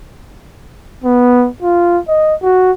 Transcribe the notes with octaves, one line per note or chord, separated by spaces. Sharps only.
B3
F4
D#5
F#4